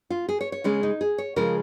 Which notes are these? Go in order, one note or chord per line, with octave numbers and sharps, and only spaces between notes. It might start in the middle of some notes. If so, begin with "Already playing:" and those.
F4
G#4
C#5
C#5
C#3 G#3 C#4
D#4
G#4
C#5
C#3 F3 G#3 A#4